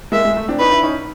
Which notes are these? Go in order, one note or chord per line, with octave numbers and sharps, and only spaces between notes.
G#3 A#3 E5
G#3
A3
C4 D4
C#4 D#4 B4
D4 E4
C#4 D#4